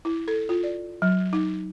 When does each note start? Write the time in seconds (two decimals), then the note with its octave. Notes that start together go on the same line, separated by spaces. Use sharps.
0.05 E4
0.28 A4
0.49 F4
0.63 D5
1.02 F#3
1.33 D#4